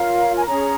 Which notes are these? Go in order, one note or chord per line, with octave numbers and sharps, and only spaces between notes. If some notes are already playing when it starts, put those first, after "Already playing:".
Already playing: F4 A#4 C#5 F5
G#5
C#4 G#4 C#5 A#5